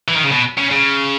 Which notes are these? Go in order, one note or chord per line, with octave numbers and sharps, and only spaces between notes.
E3
D#3
C#3
B2
C#3
C#3